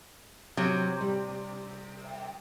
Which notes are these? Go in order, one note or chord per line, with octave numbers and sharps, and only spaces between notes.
C3 F#3
G3